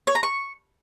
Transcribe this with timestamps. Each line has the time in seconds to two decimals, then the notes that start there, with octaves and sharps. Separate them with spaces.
0.07 C#5
0.15 A#5
0.23 C#6